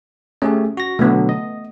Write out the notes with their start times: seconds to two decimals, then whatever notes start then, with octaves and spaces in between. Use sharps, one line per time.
0.42 A3 C#4 G4 G#4
0.77 F#4 A#6
0.99 B2 D3 F#3 A3 B3
1.29 D#5